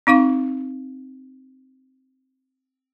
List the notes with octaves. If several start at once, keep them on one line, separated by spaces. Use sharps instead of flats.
C4 D#4 F5 C#6